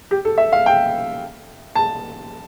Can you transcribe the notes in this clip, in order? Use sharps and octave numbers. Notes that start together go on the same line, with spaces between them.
G4
A4
E5
F5
G5
A5